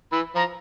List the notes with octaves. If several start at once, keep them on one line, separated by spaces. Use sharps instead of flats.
E3 B5
F3 A#5